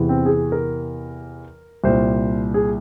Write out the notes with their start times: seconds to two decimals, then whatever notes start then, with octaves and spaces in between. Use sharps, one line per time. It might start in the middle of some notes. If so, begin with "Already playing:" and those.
Already playing: E2 C3 E3
0.09 C4
0.26 G#4
0.52 A#4
1.84 C2 A#2 C5
2.54 G#4